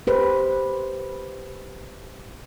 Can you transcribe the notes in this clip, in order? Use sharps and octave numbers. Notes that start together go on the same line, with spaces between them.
G4 B4 C5